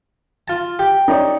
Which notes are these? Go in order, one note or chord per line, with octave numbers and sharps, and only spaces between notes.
F4 A5
G4
D#4 C#5 D5